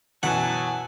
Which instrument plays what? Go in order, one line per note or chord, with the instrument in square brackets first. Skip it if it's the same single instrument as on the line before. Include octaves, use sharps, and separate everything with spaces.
[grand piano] F#2 B2 E3 [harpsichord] F#5 [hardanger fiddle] G#5 A5